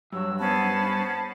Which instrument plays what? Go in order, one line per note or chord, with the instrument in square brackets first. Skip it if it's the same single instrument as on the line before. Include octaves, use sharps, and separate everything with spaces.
[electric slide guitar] G2 [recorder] F#3 [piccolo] E6
[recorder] B3 [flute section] C#4 C5 B5 [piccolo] A5